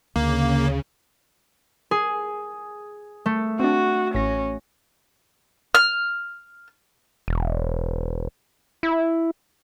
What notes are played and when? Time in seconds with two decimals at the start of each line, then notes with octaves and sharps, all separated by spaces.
0.16 D2 C#3 A#3
1.91 G#4 G#5
3.26 A3
3.60 C4 D4 F#4
4.15 A1 C#4 A#6
5.75 F6
7.28 E1
8.83 E4